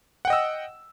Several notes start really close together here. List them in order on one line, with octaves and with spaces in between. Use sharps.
F#5 G5 D#5 E6